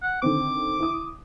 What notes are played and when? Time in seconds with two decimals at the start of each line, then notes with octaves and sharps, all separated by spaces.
0.03 F#5
0.22 D3 D#3 C4 D6
0.80 E4 D#6